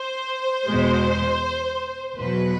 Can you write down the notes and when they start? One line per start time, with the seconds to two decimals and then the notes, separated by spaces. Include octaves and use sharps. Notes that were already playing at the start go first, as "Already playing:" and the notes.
Already playing: C5
0.68 E2 B2 G#3
2.17 E2 B2 F#3 B4